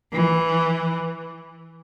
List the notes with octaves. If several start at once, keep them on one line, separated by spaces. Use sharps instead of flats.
E3